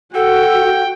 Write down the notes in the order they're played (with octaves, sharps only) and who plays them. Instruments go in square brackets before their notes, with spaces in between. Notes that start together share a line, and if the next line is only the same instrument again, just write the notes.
[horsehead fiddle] F#4 [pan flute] A4 [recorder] F#5 [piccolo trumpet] G5